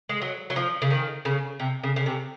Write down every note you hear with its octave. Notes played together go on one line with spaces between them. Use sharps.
G#3
F#3
F#3
F3
C#3
D#3
C#3
C3
C#3
C#3
C3